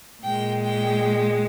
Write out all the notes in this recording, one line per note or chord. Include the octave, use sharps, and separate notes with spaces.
A#2 G#3 G5
G5